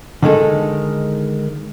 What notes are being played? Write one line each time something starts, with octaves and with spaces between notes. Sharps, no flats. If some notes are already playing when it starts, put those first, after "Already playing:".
D3 D#3 G#3 A4